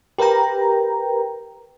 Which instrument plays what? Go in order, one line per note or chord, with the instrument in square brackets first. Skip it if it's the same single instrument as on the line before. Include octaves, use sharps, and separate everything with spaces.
[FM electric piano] G4 A#4 B4 G5 A#5